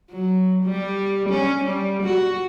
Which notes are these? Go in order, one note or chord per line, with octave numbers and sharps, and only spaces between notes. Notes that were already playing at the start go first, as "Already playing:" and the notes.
F#3
G3
C#4
G3
F#4